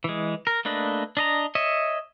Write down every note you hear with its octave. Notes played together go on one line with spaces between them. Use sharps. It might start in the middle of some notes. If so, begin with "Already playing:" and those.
E3 G#3
A#4
A3 A#3 D4 B4 D#5
D4 D#5 A#5
C#5 D#5 E5